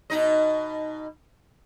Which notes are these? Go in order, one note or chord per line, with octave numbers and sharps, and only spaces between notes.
B2 D#4 D#5